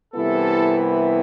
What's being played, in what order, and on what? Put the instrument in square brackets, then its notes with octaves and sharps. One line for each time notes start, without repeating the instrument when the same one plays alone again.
[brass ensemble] C2 C3 E3 B3 E4 A4